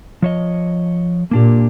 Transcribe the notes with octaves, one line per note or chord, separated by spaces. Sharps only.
F3 C#5 D#5
A#2 A#3 D4 G4